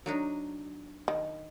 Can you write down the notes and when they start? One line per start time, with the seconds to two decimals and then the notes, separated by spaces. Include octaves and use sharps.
0.06 F#3 D4 D#4
1.08 D#3